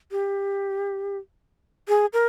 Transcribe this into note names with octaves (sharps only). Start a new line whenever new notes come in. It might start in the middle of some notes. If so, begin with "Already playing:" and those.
G4
G#4
A#4